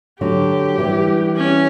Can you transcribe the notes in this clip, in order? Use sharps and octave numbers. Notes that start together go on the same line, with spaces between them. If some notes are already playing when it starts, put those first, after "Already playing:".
D3 F#3 G4
E3 G3
C#4